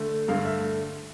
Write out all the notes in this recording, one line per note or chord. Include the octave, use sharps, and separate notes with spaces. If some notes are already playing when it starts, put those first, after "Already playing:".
Already playing: D3 A3
G2 D3 A3 F5
E5